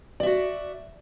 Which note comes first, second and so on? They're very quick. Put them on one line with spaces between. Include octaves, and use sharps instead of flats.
D5 E5 F#4